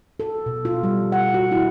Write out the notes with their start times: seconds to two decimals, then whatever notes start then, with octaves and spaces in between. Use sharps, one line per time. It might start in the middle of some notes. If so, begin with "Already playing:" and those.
0.20 A4
0.46 B2
0.65 F4
0.83 G3
1.12 F#5
1.34 F#4
1.52 E4